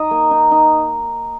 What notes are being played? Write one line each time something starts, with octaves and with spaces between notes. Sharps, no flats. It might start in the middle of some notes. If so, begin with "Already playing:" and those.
Already playing: D#4 D#5
A#3
D#4
D#4